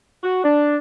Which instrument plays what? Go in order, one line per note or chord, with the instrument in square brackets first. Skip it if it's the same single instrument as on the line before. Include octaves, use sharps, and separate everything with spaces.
[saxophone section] F#4
D4